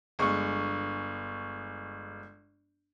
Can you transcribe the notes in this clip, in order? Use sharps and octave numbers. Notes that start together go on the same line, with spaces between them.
G1 G#3 C#6